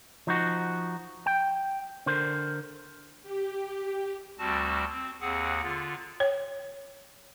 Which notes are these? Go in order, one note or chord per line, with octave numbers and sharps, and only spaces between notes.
F3 D#4 F#4
G5
D3 A#4 C5
G4
D2 G3 C4 F#4 A5
C4
D#2 C4 G#4 F#5
D3 F4
C#5